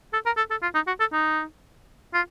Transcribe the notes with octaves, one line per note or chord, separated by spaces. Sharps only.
A4
A#4
A4
A4
F4
D#4
F#4
A4
D#4
F4